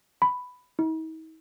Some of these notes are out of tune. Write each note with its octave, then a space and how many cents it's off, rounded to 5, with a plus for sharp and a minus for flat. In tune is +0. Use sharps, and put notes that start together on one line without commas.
B5 +5
D#4 +45